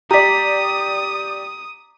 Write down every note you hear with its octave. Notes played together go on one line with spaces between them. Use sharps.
G4 D5 A#5 D#6 B6